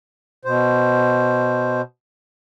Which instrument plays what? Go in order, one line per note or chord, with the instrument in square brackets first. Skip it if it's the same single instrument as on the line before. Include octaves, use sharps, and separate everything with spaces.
[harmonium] B2 C5